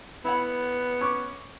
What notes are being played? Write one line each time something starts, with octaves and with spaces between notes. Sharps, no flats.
B3 E4 C#5 F#5
C#4 C#6 D6